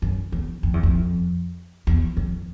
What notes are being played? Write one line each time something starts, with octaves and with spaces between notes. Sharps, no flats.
F#2
E2
F2
E2
F2
E2
F2